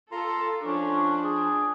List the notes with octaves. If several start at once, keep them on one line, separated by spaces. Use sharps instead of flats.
F4 A4 A#5 C6
F3 C#4 D4
G#4